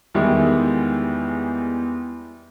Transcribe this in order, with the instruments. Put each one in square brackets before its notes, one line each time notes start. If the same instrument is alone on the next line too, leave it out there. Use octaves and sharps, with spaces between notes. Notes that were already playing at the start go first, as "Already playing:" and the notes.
[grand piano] E2 D#3 G3 G#3 E4